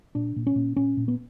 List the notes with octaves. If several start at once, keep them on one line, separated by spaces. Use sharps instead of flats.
A#2 D4
A#2
C#4
A#2
A#2 C#4
A#2
B3